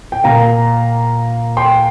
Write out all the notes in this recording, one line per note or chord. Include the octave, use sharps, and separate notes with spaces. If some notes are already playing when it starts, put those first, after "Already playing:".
G5
A#2 A#3 F5 A#5
G5 C6